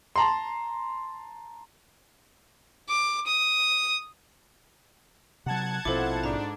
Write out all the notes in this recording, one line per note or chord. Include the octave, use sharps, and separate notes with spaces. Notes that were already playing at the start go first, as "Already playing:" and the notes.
A5 A#5 C6
D6
D#6
C3 F#3 F#5 A5 G#6
A#1 B2 C4 E4 F4 A4 C5 D6
G#2 D4 A#5